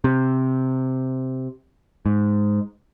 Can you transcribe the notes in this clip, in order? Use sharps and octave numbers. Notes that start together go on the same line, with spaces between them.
C3
G#2